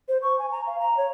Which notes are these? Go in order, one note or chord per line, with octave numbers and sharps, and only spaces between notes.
C5
C#6
G#5
A#5
F5
A#5
C#5